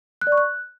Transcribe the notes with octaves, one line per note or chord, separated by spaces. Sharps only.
F#6
D5
C#6
F#6